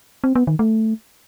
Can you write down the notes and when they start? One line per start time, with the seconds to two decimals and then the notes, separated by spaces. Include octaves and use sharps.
0.24 C4
0.35 B3
0.47 D#3
0.59 A3